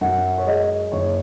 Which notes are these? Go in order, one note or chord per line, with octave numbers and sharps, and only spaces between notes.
F#2 F#5
C#5
G#3 D#5
F#1 C#5